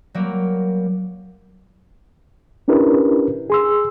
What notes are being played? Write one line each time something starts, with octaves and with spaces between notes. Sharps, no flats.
F#3 G3 A#3
C#4 D4 E4 G4 A#4 B4
G#4 C6 E6